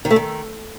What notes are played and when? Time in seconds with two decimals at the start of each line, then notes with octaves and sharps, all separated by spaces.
0.05 D#3
0.11 A3
0.16 D#3